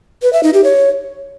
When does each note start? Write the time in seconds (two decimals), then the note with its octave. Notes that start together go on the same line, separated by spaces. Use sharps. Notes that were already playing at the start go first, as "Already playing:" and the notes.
0.22 B4
0.33 E5
0.43 D#4
0.54 G4
0.64 C#5